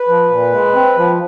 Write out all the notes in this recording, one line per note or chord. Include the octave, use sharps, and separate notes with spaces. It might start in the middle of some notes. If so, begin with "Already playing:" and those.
Already playing: B4
F3
A#2
G#3
C4
F3